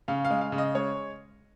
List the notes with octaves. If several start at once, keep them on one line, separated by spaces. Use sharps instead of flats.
C#3 F5
F5
G#3
F5
C#3
D#5
G#3 C#5